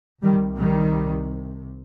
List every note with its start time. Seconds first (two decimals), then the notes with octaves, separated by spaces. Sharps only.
0.23 C2 C3 D#3 G3
0.58 D#3 G3